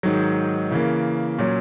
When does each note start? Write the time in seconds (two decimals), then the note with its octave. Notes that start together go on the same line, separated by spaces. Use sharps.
0.03 G#2 D#3 F#3
0.71 C#3 E3 A#3
1.39 A#2 F#3 C#4